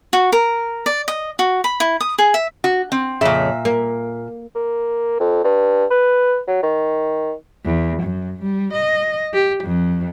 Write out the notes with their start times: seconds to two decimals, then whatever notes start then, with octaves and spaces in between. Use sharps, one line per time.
0.13 F#4
0.32 A#4
0.86 D5
1.08 D#5
1.39 F#4
1.64 B5
1.80 E4
2.01 D#6
2.18 G#4
2.34 E5
2.64 F#4
2.92 C4
3.21 F2 A#2 C#3 E5
3.65 A#3
4.56 A#3
5.20 F2
5.45 G2
5.91 B4
6.47 F#3
6.63 D#3
7.65 E2
8.03 F#2
8.42 G3
8.73 D#5
9.33 G4
9.64 F2